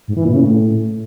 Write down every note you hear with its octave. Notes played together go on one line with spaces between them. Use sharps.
G#2
E3
A#2
C#3
A2